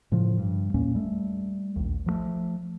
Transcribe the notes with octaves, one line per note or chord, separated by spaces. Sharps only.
A2 C#3 F3
G2
E2 A#2 A#3 C#4
G3 A3
A#1 D#2
F3 F#3 A3